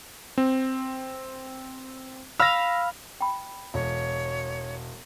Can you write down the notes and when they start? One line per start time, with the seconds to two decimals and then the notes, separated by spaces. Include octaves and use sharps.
0.38 C4
2.40 F5 B5 E6 F6 A#6
3.21 G5 B5
3.74 E1 C#5